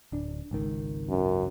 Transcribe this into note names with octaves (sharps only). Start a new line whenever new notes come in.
D1 D4
G#1 C#2 D#3
F#2